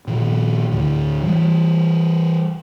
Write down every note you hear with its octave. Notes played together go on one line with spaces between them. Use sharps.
A#2 D#3 F3
D2 A2 D3
E3 G3